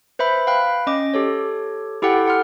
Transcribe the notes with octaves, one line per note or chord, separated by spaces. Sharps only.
B4 C5 E5 B5
F5 G5 B5 F#6
C#4 D#5 D6
G4 A4 C#5
E4 G4 A4 F#5 G5
A4 F#5 C6 F6